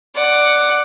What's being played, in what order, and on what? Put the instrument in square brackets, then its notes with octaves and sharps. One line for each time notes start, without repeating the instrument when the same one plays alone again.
[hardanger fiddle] D5 F#5